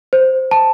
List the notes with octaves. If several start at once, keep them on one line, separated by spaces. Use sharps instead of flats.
C5
A5